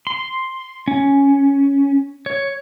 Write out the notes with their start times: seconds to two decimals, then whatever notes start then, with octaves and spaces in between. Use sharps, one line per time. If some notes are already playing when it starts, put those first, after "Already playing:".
0.07 C6
0.88 C#4
2.26 C#5